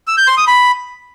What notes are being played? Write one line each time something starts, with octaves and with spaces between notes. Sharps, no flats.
E6
G6
C6
D#6
B5